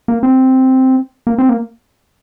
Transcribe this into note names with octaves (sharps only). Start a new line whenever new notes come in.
A#3
C4
A#3
C4
A#3